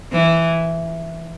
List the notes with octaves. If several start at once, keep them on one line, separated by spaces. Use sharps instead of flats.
E3